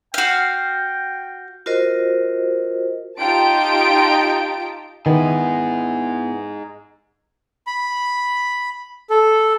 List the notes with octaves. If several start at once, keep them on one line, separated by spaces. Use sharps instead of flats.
F#4 F5 G5
F4 F#4 A#4 C5 D#5
D#4 F4 G4 G5 A5 D7
D#3 B3 D#4 E4 G#4
B5
A4